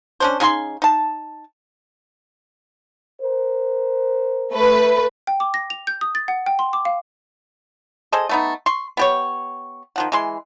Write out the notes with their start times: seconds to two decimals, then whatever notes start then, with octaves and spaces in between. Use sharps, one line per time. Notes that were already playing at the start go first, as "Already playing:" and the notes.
0.20 C#4 D4 C5
0.40 C#3 D#4 G#5 C6
0.82 D#4 A5
3.21 A#4 C5
4.52 A3 B4
5.27 G5
5.40 D6
5.54 A#6
5.70 F7
5.87 G6
6.01 D#6
6.15 A6
6.28 F#5
6.46 G5
6.59 C6
6.73 D6
6.85 F5
8.12 G#4 A4 C5 D#5
8.29 A3 B3 D#4
8.66 C6 C#6
8.97 B3 G4 C#5
9.96 D#3 F3 F#5
10.12 E3 G#3 C6